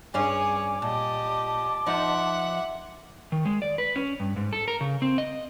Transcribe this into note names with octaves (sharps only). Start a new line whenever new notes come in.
G2 C#4 G#4 C#5 F5 G#5 D6
A#2 G4 D#5 A5
F3 D#4 E5 F#5
D#3
G#3
D5
B4
C#4
G2
G#2
A4
A#4
C#3
C4
D#5